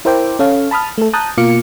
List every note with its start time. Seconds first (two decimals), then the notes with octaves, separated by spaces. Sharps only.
0.05 E4 A#4 C5 E5 G5 D6
0.39 C#4 A4 C#5 F5
0.71 A5 B5 D#6 F6
0.98 A3 A4
1.13 A5 A#5 D#6 F#6 G6
1.38 B2 A#3 F4 F5 D6 C#7